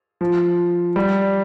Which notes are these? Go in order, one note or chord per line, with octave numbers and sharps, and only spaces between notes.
F3
G3